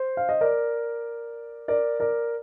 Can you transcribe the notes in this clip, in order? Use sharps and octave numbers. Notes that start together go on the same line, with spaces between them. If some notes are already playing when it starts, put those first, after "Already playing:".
Already playing: C5
F5
D#5
A#4 D5
A#4 D5
A#4 D5